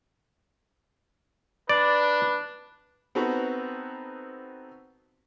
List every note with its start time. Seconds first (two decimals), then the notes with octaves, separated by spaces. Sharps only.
1.69 D4 B4 D5
3.15 B3 C4 D#4 F#4 A4 B4